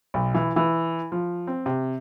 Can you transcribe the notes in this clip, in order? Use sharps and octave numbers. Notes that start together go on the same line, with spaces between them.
B1
E3
E3
F3
C4
C3